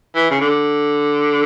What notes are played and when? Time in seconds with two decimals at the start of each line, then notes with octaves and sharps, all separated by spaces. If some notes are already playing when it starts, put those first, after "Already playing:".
0.15 E3
0.31 C#3
0.41 D3